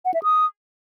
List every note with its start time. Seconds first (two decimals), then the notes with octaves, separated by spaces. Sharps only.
0.05 F#5
0.14 E5
0.23 D#6